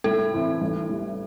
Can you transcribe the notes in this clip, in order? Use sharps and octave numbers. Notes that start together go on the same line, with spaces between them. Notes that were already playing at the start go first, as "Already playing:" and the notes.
A2 A4
E3 C4 E4
A1
A2 G3